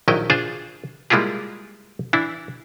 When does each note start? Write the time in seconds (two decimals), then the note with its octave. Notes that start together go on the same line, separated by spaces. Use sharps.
0.08 A#1 D#3 F#3 E4 D#5 G5
0.30 D4 F4 G#4 C5
1.10 G3 G#3 A#3 E4 F4 G#4
2.13 E3 D4 E4